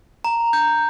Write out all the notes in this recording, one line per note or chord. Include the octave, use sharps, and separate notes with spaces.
A#5
G6